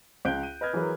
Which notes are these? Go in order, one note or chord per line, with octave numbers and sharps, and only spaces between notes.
C#2 F#6 G6 D7 G7
D#7
B4 D#5 F6 G#6
E3 F#3 G#4 A#4 B4